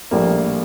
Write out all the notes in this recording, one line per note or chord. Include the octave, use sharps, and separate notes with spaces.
A#1 A2 G3 A#3